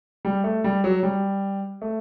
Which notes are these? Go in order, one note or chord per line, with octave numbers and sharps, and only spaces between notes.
G3
A3
G3
F#3
G3
A3